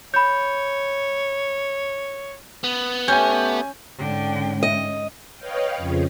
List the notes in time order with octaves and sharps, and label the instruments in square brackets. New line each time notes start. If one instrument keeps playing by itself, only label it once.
[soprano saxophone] C#5 [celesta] B5 G6
[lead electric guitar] B3
[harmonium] A3 G4 [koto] C#4 [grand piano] G#5 G6
[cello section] G#2 C#4 [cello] D3 G5
[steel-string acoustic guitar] D#5
[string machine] B4 C#5 D#5 F5 G5
F2 C#3 F3